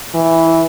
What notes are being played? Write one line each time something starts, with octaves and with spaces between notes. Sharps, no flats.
E3